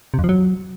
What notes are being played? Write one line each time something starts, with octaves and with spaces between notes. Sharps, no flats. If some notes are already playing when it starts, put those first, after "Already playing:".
C3
F2
F3
F#3